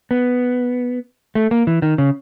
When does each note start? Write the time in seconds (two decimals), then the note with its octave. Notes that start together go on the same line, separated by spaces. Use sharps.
0.11 B3
1.35 A3
1.51 A#3
1.67 E3
1.82 D#3
1.98 C#3